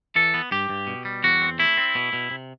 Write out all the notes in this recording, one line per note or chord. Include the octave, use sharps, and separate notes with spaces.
E3 A4
B3
G2 G4
G2
B2
G3
E2 F#4
C4
A3 E4
C4
B2
B2
C3